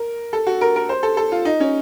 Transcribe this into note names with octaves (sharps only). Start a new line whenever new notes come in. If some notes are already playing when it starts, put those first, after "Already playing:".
Already playing: A#4
A4
F#4
A#4
A#4
C5
A4
A4
F4
D#4
C#4